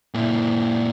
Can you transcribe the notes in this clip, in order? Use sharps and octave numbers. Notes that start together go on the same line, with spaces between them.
A#2 E4